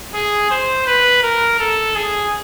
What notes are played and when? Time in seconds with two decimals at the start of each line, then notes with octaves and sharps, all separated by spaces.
0.14 G#4
0.51 C5
0.87 B4
1.23 A#4
1.59 A4
1.95 G#4